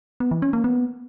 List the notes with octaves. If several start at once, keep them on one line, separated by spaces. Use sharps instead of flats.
B3
E3
C#4
A#3
B3